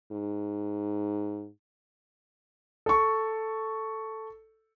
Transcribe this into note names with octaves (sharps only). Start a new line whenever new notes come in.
G#2
A4 C#6